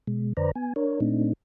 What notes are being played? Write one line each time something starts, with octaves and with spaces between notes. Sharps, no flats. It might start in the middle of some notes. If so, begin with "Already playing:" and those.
B2 G#3
F2 D3 B4 C5 D5 A#5
B3 G#5
D4 A#4 C#5
A#2 A3 C4 D4 D#4